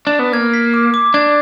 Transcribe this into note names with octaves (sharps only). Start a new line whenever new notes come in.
D4
B3
A#3 G#6
B6
D6
D6
D4 G#6